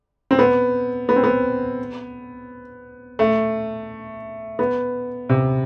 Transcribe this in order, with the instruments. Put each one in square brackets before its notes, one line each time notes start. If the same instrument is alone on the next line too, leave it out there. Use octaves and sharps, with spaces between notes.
[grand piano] C4
B3
B3
C4
B3
A3
B3
C3